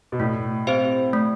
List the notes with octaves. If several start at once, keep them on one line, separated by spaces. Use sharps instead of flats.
B2
A2 A3
C4 G4 C5 F5
A3